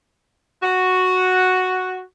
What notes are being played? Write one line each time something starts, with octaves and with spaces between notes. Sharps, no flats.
F#4